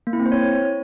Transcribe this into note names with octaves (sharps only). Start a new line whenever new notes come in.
A#3
E4
C4
C5
C#5